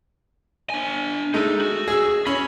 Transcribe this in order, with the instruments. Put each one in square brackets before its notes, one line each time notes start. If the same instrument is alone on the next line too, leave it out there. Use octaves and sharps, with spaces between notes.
[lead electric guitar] D4 G#5
[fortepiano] G#3 A3 [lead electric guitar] D#4
[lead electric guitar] F#4
[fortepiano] G#4 E6
[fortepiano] C#4 [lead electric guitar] B5